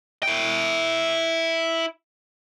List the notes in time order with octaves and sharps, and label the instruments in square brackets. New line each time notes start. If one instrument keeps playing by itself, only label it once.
[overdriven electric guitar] E4 G5